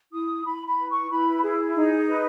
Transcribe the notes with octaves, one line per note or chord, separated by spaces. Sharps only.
E4 D#6
E4 B5
B5
B4
C#6
E4 B5
G#4
D#4
B4